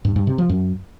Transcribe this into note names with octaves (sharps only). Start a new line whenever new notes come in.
G2
G2
C3
F3
F#2